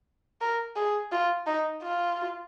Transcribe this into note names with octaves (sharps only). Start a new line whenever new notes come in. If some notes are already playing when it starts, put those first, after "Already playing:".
A#4
G#4
F4
D#4
F4